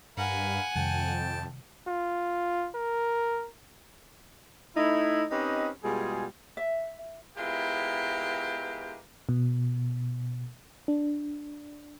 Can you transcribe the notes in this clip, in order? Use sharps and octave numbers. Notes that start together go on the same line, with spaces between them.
G2 A#4 F5 F#5 G#5 B5
F2 C3 D#3 G3 G5 A5
F4
A#4
A3 D#4 E4
C4 C#4 D#4 G4 B4 D#5
B2 G3 G#3 F4 G#4
E5
G#3 B3 E4 F4 G4 A#4
B2
D4